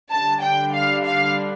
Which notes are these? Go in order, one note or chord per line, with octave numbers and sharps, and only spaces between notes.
D3 G3 D4 A5
G5
F5
F5